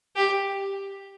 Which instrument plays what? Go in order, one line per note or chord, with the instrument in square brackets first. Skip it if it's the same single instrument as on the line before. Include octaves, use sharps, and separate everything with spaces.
[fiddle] G4